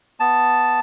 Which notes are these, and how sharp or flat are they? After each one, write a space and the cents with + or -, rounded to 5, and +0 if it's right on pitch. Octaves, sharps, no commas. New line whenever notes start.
B3 +0 A5 +0